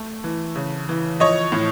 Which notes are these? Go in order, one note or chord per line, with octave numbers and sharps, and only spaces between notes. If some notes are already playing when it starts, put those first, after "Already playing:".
Already playing: A3
E3
C#3
E3
F3 C#5 D#5
A2